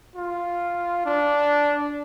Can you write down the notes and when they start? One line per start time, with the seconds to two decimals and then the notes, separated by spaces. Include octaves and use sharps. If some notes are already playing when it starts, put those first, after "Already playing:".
0.16 F4
1.06 D4